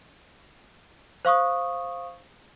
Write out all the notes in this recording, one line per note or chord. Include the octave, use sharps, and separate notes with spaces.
C5 F5 C#6 D#6